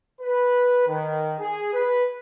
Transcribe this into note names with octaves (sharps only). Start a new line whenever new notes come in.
B4
D#3
G#4
B4